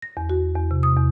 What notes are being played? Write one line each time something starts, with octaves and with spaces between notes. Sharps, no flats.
A#6
E2
F#4
E2
C3
D#6
E2